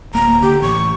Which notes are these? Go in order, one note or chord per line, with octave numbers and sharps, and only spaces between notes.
D1 A#3 A#5
D3 G4
A1 C#6